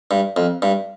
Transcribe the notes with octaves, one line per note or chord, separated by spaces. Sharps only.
G2
F2
G2